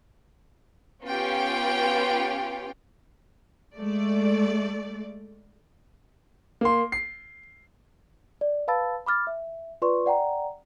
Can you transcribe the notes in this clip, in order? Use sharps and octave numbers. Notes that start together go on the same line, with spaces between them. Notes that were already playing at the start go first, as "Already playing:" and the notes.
B3 C#4 F4 G4 G5
G#3 A3 D5
A#3 C6
C7
D5
B4 F5 A5 B5 E6 A6
B5 D6 F6 A6
E5
F4 B4 D5 C6 C#6
D5 F#5 G5 A#5